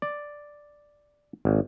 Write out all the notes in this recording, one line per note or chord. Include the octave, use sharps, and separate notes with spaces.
D5
G#1